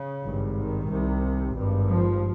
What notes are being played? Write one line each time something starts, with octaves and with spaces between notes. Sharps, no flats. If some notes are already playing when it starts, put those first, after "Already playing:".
Already playing: C#3
G#1 G2
D#3
C2 C3
G#1 G2
F3